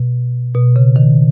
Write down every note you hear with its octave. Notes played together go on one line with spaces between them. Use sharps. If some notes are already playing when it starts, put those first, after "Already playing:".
Already playing: B2
B2
C#3
D#3